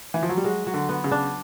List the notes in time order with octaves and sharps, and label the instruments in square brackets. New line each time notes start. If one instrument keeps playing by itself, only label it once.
[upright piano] E3
F3
F#3
G3
[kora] F#3 [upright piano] G#3
[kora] F#3
[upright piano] D3
[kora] B3
[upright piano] C#3
[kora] D4